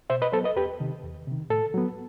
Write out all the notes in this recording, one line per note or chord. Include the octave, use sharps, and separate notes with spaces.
B2 C5 E5
B4 D#5
F#3 B3 A4 C5
B4 D#5
E2 G4 B4
C3 D#3
E2
C3 D#3
A2 A4
F#3 B3